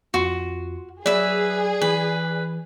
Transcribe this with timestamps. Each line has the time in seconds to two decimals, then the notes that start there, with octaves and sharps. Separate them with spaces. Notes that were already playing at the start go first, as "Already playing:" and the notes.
0.14 F2 F4 F#4 C6
1.06 F#3 G#4 B4 D5 E5
1.81 E3 B4